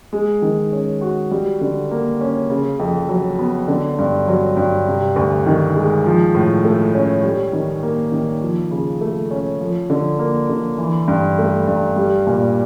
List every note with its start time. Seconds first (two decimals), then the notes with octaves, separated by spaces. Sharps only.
0.13 G#3
0.42 D#3
0.72 C#4
1.01 F#4
1.31 G3
1.61 D3
1.91 A#3
2.21 C#4
2.50 C#3
2.79 F2
3.09 F#3
3.39 B3
3.68 D3
3.99 G2
4.28 F#3
4.57 G2
4.87 C3
5.16 D2
5.46 D#3
5.75 G#3
6.06 F3
6.35 A2
6.65 A3
6.94 C#4
7.23 G3
7.53 D#3
7.83 A#3
8.12 D#3
8.42 F3
8.71 C#3
9.01 A3
9.31 C#4
9.60 F3
9.90 D3
10.19 A#3
10.49 D3
10.78 E3
11.08 G2
11.38 A3
11.67 G2
11.96 G3
12.27 A#2